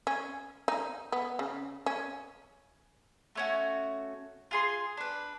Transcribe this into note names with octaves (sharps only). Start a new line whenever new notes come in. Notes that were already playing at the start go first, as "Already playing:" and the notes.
C#4
D#4
B3
C#3
C#4
A3 C#4 F#4
F4 G#4 C6
D4 B4